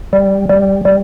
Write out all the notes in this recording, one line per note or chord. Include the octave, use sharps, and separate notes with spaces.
G3
G3
G3